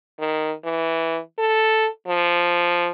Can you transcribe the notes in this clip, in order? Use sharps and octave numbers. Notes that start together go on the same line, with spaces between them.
D#3
E3
A4
F3